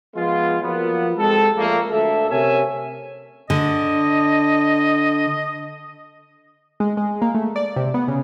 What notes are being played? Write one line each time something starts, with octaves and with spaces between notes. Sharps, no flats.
F3 G#3 B3 F4
F3 F#3 A#3 B3
G#3 C4 G4 A4
F2 A#2 A3 A#3
D2 A4 E5
C3 C#4 A#4 C#5 E5 G#5
D3 D#5
G#3
G#3
A#3
A3
D5
C3
B3
C#3